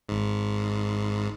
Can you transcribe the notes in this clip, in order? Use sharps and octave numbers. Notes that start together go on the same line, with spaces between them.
G#1 G#2